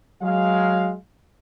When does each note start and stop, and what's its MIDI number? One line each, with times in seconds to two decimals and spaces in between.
0.22 0.94 54
0.22 0.94 56
0.22 0.94 77